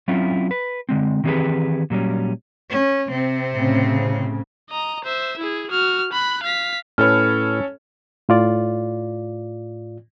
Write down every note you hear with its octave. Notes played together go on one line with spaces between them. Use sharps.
F#3 C4 C#4 E4 F4
B4
D3 G#3 C4
D#3 E3 C4 G4 G#4 B4
A#2 F#3 G3 C#4
C#4
C3 C4
A2 C#3
D#5 A#5
C5 E5
E4 G#4
F#4 F6
B5 F#6
F5 B6
A2 C#4 A4 B4 C#5 F6
A2 F4 D5